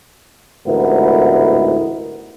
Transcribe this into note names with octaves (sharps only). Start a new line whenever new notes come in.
A1 D2 G#2 B3 E4 A#4